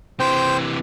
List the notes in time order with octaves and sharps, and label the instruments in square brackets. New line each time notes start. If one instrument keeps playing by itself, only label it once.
[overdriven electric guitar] C3 E3 [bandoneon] C5 G5 G6